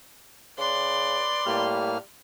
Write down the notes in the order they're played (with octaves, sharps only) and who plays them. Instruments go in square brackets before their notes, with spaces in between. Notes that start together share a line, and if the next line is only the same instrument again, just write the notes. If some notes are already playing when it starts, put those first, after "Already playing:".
[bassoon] C#3 [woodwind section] B4 D5 [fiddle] C6
[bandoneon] A2 A#3 F6 [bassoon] G3